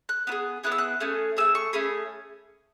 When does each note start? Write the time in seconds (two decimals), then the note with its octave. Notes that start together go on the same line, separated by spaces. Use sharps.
0.09 F#6
0.27 B3 E4
0.32 G#4
0.63 B3 E4 G#4 F#6
0.72 E6
0.78 F#6
1.00 A3 C#4 G#4
1.37 A3 C#4 G#4 E6
1.55 C#6
1.73 A3 C#4 G#4 B5